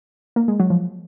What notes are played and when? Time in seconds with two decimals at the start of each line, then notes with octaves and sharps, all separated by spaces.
0.36 A#3
0.48 G#3
0.60 F#3
0.70 F3